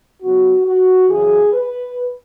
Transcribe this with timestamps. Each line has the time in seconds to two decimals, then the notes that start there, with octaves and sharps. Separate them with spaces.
0.21 C#3 F#3 B3 F#4
0.65 F#4
1.09 F#2 C#3 E3 G#4
1.53 B4